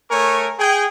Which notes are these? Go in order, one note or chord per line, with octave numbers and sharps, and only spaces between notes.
A3 A#4 C#5 G#5 C#6
G#4 G5